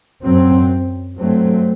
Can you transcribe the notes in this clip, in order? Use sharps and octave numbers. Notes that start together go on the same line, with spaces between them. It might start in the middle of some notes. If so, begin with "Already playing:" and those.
F#2 F#3 C4
G2 F#3 A3 C4